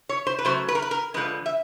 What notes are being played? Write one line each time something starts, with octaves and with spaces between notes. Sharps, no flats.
C#5
C5
B4
C#3 F#3 A3 C5
B4
A#4
B4
A#4
D3 F3 G#3 B4
E5